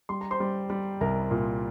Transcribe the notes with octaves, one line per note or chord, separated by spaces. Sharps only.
G3 C6
A#5
C5 C6
G3
G3
C2 A#4 A#5
A#2